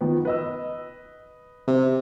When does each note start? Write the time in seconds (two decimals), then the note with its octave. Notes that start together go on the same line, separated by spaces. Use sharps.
0.01 D#3 F3 B3
0.25 B4 D#5 E6
1.68 C3